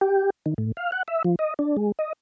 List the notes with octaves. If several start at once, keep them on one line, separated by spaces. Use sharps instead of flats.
G4
D#3
A2
F5
F#5
E5
F3
D#5
D4
G#3
D#5